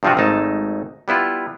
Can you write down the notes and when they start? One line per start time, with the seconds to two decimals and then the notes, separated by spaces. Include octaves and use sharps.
0.03 G2 C3 F3 C4 F4 F#4
0.17 G#1 A3 D#4 A5
1.08 G3 B3 E4 F4